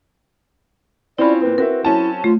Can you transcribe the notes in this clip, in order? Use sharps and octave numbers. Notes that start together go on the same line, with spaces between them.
C4 C#4 E4 F4 D5 B5
A#2 C4 B4
C4 F#4 A#4 E5
F#3 C#4 E4 A5
A3 F4